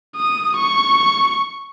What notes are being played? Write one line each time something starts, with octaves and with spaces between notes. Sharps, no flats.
D#6
C#6